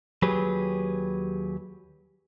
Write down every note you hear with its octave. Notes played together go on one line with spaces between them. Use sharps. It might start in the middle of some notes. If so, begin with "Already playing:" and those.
D#2 F#3 G4 G#4 B4